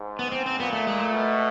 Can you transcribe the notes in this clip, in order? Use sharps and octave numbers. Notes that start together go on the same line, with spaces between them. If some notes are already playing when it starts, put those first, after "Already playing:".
Already playing: G#2
B3
C4
C4
A#2 B3
A3
G#3
A3
B2